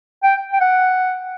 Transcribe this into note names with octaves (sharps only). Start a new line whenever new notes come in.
G5
G5
F#5